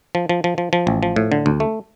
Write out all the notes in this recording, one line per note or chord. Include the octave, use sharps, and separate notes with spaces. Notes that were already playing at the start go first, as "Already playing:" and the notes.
F3
F3
F3
F3
F3
A1
F3
A2
D3
D2
A3